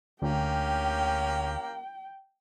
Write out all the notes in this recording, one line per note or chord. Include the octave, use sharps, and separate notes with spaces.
D2 A#3 C#4 G4 G5